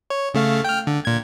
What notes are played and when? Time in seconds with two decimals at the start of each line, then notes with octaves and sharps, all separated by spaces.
0.10 C#5
0.34 C#3 A3 F5
0.65 G5 F6
0.87 D3
1.05 A#2 G#6